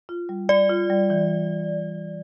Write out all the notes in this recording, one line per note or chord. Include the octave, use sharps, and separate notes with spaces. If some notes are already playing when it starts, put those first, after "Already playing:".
F4
G3
G3 D5
F4
G3
E3